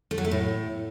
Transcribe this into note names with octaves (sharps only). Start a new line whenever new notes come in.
A3
F#3
A3
A2